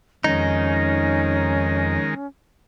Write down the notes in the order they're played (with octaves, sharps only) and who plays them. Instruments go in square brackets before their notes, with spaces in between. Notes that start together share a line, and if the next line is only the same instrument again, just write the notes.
[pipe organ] F2 [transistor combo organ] D#3 G#3 A#4 [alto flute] C#4 [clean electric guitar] D#4